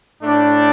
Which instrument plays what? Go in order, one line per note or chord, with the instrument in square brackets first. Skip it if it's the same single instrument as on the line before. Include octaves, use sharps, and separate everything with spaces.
[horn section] A2 A3 D4